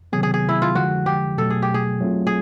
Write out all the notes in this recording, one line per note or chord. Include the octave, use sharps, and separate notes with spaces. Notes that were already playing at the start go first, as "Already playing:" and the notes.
C3 D#3 F#3 B3 G#4
G#4
G#4
E4
F4
D3 F3 G#3 F#4
G4
B2 F#3 A3 A4
G#4
G4
G#4
F#3 A3 C4 F4
G#4